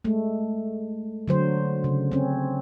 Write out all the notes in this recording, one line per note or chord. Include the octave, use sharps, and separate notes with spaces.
G#3 A3
D3 F#3 C5
C#3
C4 C#4